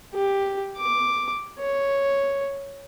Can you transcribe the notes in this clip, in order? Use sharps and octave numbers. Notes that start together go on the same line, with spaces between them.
G4
D6
C#5